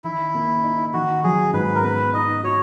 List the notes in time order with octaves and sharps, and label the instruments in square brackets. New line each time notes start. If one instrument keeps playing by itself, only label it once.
[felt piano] D#3 [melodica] E4
[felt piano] A#3
D#4
[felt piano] D#3 [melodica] F#4
[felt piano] F#3 [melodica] G#4
[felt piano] G#2 [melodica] B4
[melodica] A#4
[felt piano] B3 [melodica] B4
[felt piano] D#4 [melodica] D#5
[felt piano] F#4 [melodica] C#5